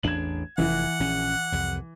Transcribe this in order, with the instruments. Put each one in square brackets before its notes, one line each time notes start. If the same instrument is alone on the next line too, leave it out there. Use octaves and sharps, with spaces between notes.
[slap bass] A1 E2 D4 [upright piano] G#6 E7 F#7
[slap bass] F1 E2 [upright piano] E3 [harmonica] F#5
[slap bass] A#1 C#4
C2 F2